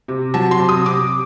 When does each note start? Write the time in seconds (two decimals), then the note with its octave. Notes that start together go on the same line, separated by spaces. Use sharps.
0.08 C3
0.34 F#3 A5
0.51 C6
0.60 C3
0.69 D#6
0.86 C3 D6